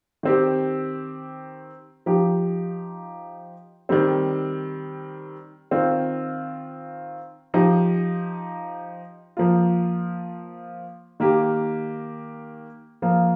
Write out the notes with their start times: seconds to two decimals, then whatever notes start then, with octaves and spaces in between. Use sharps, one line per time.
0.23 D#3 C4 G4
2.06 F3 D#4 G4
3.89 D#3 G3 C4
5.71 D#3 C4 F4
7.54 F3 D#4 G4
9.37 F3 A#3 F4
11.20 D#3 A#3 G4
13.02 F3 A#3 F4